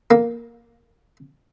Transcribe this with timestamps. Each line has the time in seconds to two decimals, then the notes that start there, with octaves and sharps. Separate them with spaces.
0.11 A#3